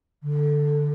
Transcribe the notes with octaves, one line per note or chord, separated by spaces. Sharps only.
D3